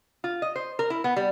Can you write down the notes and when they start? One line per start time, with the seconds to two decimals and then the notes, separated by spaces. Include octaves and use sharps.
0.24 F4
0.42 D#5
0.56 C5
0.79 A#4
0.90 E4
1.04 B3
1.16 G3